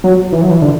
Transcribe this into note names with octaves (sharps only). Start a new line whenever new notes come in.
F#3
E3
F#3
E3
D3